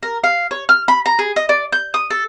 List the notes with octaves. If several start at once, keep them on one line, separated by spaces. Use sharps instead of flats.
A#4
F5
C#5
F6
B5
A#5
G#4
D#5
D5
G6
D#6
A4